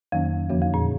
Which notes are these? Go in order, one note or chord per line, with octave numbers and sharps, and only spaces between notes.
F2 D#3 F#3 A#3 C#4
E2 D3 F3 A#3 C#4 F#4
F2
A#2